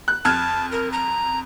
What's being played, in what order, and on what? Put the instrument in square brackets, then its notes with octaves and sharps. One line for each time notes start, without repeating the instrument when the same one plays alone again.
[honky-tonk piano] F#6
[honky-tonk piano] F2 F6 G#6 [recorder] A5
[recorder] A#4
A#5